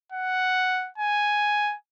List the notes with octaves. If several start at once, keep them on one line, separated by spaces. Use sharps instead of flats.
F#5
G#5